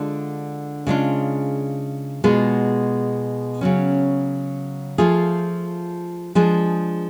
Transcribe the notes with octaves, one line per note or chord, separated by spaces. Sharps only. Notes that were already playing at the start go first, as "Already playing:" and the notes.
Already playing: D3 G#3 D4 F4
C#3 G#3 D4 F4
B2 G#3 B3 F4 G#4
C#3 F#3 C#4
F3 A3 F4 G#4
F3 G#3 D4 G#4